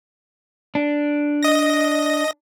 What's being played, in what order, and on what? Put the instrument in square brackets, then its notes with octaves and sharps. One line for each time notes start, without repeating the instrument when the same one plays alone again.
[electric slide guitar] D4
[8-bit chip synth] D#5 A#6